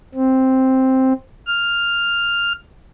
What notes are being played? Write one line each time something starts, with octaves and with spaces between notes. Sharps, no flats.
C4
F6